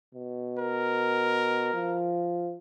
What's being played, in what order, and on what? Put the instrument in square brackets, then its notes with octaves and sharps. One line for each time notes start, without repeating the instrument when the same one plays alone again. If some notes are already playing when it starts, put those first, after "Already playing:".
[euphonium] B2
[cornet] A#4
[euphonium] F3